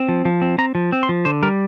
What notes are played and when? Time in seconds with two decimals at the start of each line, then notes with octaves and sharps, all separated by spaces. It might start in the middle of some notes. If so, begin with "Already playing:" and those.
Already playing: C4
0.09 F3
0.25 F3
0.42 C4
0.58 C4 A#5
0.75 F3
0.92 C4
1.03 C6
1.09 F3
1.25 D3 C5
1.43 G3 A#4